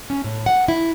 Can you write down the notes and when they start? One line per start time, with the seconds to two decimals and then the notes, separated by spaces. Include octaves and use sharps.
0.10 C#4
0.24 A2
0.46 F#5
0.68 E4